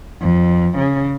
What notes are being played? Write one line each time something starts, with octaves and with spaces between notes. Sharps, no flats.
F2
C#3